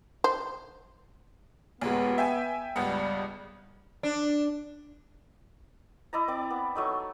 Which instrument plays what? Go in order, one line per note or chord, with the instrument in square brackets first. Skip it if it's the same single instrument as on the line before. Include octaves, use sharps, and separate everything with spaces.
[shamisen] C5
[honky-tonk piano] D#2 A#2 G#3 [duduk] B3
[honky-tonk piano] E5 G5 G#5
[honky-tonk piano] C#2 G2 B3 [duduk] G3
[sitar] D4
[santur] E4 D5 D#5 A#5
C4 D5 D6
B3
F#3 A3 D#4